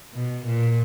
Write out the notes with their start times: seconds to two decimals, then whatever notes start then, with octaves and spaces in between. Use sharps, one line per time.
0.14 B2
0.46 A#2